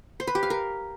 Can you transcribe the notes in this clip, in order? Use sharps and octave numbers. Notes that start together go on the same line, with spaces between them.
C5
B4
G4
F5
A#4